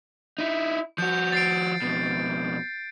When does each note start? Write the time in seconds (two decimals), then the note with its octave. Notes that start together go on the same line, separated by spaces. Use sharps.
0.38 D#4 E4
0.98 F3 F#4 G6
1.32 A6 C7 D7
1.82 F2 B2